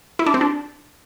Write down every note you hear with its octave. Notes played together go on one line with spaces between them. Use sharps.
E4
D4
C4
D4